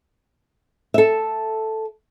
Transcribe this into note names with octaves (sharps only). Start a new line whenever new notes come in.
A4 E5